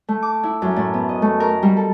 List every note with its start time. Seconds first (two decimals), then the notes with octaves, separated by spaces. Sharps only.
0.08 A3
0.22 D6
0.43 E4
0.62 F#2
0.76 A2
0.94 B3
1.09 D#5
1.22 A3
1.40 A#4
1.63 G3
1.77 A4